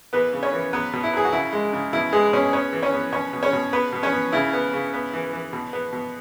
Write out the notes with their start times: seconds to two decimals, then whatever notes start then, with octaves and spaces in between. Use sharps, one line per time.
0.13 E3 B3 B4
0.33 C#3
0.43 C#4 C#5
0.53 E3
0.73 F#3 B3 B4
0.93 B2
1.03 E4
1.13 F#3 G#4
1.25 F#4
1.33 C#3 E4
1.53 G#3
1.73 C#3
1.93 B2 E4
2.12 G#3 B3 G#4
2.33 B2 C#4 C#5
2.53 B3 C#4 C#5
2.73 E3
2.83 C#4 C#5
2.93 B3
3.12 B2 C#4 C#5
3.33 B2
3.43 C#4 C#5
3.53 B2
3.73 B3 B4
3.93 B2
4.03 C#4 C#5
4.13 B3
4.32 C#3 E4
4.53 B3
4.73 C#3
4.94 B3
5.13 E3
5.33 E3
5.53 B2
5.73 B3
5.93 B2